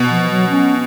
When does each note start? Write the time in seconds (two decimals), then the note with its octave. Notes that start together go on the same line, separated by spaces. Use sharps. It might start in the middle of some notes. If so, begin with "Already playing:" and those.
Already playing: B2
0.10 F3
0.31 F#3
0.50 C#4